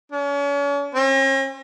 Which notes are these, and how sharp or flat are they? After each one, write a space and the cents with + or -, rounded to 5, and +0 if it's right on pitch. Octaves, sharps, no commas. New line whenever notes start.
C#4 +40
C#4 -45